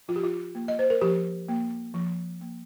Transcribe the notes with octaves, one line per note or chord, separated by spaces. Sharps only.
F3 F4
G4
F4
A#3
D#5
C5
A#4
F3 G4
A#3
F3
A#3